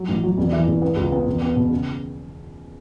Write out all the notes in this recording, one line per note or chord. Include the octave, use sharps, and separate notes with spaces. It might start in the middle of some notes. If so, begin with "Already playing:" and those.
Already playing: F#3
A1
F#3
E1
E3
E1
B3
C#2
B3
E1
B3
B2
C#3